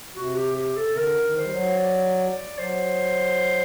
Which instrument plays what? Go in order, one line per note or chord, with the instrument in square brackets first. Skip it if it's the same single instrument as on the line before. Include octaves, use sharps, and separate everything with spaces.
[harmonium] C3 [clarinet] F#4
[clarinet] G4
G4
A4
[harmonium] C3
[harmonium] D3 [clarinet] A#4
[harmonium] D#3
[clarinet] C5
[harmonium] G3
F#3
[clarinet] D5
[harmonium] F#3 [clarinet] C5